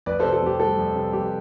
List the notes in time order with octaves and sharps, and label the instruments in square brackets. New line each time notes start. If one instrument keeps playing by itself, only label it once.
[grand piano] F2 B4 D5
C3 A4 C5
A4
F2 G4
G3 A4
F2
C3
F2 G4